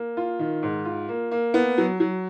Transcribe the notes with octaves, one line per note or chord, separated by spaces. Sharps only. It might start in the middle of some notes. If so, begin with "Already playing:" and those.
Already playing: A#3
F4
D#3
G#2
F4
A#3
A#3
B3
F#3
F#3